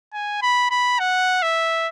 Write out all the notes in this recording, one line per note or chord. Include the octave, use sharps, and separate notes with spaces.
G#5
B5
B5
F#5
E5